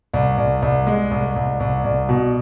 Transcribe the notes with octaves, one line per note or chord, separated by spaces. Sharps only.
C2
C2
C2
G#3
C2
C2
C2
C2
B2